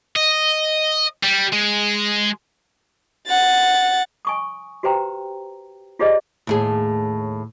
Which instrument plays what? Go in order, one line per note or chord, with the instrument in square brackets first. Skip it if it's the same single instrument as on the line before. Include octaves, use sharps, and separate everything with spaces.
[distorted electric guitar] D#5
G3
G#3
[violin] F#5 A6
[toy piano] G#5 C#6 D#6
F#4 G4 B4 C5 G5 A#5
F4 G4 G#4 C5 D5 D#5
[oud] D#2 A2 G#4